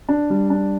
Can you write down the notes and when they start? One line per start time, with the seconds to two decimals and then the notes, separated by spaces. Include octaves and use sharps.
0.09 D4
0.30 G3
0.50 D4